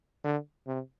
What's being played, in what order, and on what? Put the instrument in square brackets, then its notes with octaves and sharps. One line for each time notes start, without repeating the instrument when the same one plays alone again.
[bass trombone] D3
C3